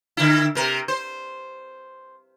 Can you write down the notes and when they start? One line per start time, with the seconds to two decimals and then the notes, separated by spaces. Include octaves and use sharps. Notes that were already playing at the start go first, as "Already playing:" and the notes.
0.17 D3 E4
0.55 C3 A#4
0.88 C5